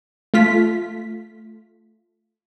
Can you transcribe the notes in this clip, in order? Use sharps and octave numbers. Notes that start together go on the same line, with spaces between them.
A3 F4 B6